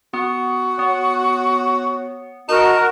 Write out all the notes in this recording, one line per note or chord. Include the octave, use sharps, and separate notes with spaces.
B3 F#4
B3 C#5
D#4 F#4 A#4 A5